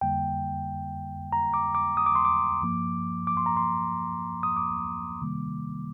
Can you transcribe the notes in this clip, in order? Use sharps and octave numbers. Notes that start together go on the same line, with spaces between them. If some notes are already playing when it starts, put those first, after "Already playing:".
F2 D3 G3 A#3 G5
A#5
D6
D6
D#6
D6
C6
D6
G2 F3 A#3
D6
C6
A#5
C6
D#6
D6
C3 D#3 G3 A#3